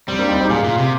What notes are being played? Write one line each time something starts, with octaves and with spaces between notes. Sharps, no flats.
G3 C4
A#3 D4
C4 D#4
D#4 G4
A#2 F4 G#4
A#2
C3